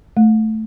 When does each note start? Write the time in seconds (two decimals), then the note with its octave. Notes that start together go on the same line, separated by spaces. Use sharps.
0.17 A3